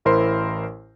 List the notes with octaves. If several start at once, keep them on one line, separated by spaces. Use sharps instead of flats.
A1 E4 A#4 C5 C6